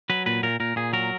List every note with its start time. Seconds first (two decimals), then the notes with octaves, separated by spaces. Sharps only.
0.10 F#3 B4
0.26 A#2 B4
0.43 A#2 A#4
0.60 A#2 A#4
0.76 A#2 G#4
0.93 F#3 A#4